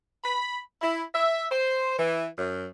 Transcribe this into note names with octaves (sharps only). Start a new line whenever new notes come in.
B5
E4
E5
C5
E3
F#2